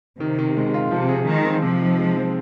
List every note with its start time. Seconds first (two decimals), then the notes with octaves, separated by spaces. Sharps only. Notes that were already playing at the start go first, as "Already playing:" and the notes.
0.20 C3 D#3
0.39 D#3
0.57 G#3
0.74 F4
0.91 C3 F3
1.09 G#4
1.27 D#3 G#3
1.45 C4
1.62 C3 F3
1.80 D#4
1.99 G#3
2.17 C4